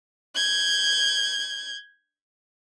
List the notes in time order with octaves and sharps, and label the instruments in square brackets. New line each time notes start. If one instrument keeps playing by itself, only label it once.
[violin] G6 G#6